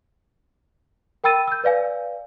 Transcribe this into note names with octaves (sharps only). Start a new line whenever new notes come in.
A#4 G5 B5 E6 A6 D#7
E6 G6
B4 D5 F5 G#5